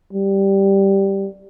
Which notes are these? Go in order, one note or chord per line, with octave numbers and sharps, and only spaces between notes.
G3